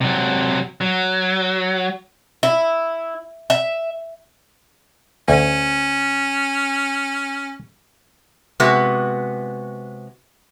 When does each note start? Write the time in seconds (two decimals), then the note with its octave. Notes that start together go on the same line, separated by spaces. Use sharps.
0.01 C3 F#3
0.81 F#3
2.43 E4
3.50 E5
5.28 D2 C#4
8.60 C3 G#3 B3 F#4